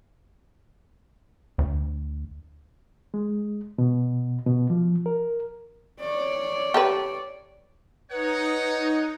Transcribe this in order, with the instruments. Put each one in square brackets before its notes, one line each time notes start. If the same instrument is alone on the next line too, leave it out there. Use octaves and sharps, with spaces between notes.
[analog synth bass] D2
[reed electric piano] G#3
B2
B2
F3
A#4
[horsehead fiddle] C#5 D5
[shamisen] G4 A4 B4
[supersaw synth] D#4 [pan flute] B4 [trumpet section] C#5 F#5